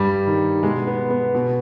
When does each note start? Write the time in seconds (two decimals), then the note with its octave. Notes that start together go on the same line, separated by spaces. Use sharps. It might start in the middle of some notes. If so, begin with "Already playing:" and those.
Already playing: G2 G3
0.27 D#3
0.63 B2 G#3
0.87 B3
1.10 B3
1.35 B2